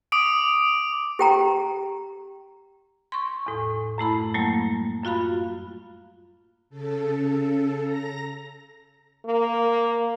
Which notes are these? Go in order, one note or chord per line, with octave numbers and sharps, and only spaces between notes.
D6 D#6 D7
G4 G5 A#5
C6 C#6
E2 A2
F#2 A3 E4 B5
F#3 G3 A3 A#3
F#2 F4 F#4 F5 B5
C#3 A4
A#5 A#6
A#3